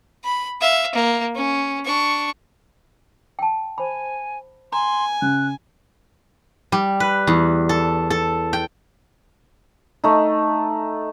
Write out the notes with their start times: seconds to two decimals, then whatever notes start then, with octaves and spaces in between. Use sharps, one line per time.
0.24 B5
0.61 E5 F5
0.95 A#3
1.35 C#4
1.85 D4 C#6
3.39 G5 A5
3.78 C5 G#5 B5
4.72 G#5 A#5 C6
5.22 C#3 F#6
6.72 G3
7.00 B4
7.27 E2
7.69 A4
8.10 A4
8.53 G5
10.04 A3 D#4